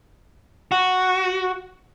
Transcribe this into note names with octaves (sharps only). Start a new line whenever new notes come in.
F#4